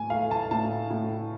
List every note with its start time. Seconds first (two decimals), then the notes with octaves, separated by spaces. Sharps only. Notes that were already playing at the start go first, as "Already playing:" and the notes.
Already playing: A2 G#5
0.10 A3 F5
0.31 A5
0.51 A2 A5
0.90 A2